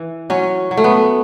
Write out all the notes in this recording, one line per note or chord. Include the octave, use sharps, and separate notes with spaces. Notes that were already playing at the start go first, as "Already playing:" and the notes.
Already playing: E3
F#3 C#4
F#3
A3
B3